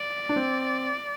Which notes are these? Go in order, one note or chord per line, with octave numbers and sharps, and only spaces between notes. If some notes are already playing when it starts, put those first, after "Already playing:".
Already playing: D5
D4
C4